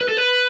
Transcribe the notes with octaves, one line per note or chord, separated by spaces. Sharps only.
B4
A4
B4